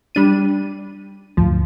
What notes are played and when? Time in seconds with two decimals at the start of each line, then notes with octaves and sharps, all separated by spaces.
0.15 G3 D4 D#7
1.37 D2 G2 F3